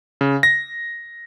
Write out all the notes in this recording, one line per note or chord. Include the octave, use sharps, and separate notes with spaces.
C#3
A#6